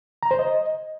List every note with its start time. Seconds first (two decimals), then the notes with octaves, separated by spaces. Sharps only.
0.23 A#5
0.31 C5
0.39 D#5